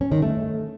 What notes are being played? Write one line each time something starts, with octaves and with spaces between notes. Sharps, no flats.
C#4
D#3
A3